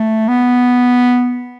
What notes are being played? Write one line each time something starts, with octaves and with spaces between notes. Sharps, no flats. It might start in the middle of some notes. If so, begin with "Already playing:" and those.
Already playing: A3
B3